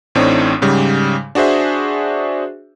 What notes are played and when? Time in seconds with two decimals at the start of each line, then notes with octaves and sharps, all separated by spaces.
0.15 A1 A2 C4 D4 D#4 C#5
0.62 G#2 C#3 G3
1.35 D4 F#4 G#4 C5 E5